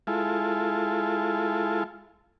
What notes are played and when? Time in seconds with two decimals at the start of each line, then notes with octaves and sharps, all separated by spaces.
0.07 G#3 E4 F4 A4